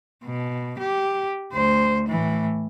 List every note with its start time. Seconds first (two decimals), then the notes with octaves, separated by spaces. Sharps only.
0.25 B2
0.78 G4
1.53 D2 C5
2.08 A2 E3